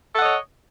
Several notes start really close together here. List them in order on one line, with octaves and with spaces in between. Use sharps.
A4 F#5 D#5 C#5